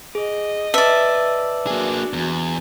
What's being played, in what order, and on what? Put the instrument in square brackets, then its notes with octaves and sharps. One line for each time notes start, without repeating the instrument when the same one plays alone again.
[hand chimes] G#4 [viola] D#5
[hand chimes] B4 A5 [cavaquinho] D5 E5
[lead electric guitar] A#3 G#4 [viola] D4 F#4
[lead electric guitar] E2